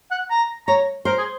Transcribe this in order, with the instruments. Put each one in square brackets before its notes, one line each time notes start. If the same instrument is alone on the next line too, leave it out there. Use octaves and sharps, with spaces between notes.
[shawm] F#5
A#5
[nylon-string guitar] C#5 [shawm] A#5
[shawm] A#4 [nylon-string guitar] C5
[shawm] G#4